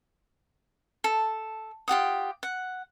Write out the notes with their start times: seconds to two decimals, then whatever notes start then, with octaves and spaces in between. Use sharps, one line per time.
1.04 A4
1.88 F4 G4 F#5 D#6
2.43 F#5